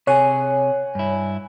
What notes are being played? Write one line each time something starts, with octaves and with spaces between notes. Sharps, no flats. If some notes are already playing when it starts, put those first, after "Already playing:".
C3 G#4 C#5 F#5 G#5
G2 E4